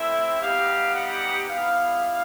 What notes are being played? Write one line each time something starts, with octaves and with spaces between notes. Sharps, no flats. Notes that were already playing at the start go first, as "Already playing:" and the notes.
Already playing: A3 C4 E4 E5
G3 B3 D#4 G4 F5
F#5
G3 B3 E4 F5